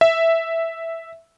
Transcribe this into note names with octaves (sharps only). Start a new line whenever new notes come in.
E5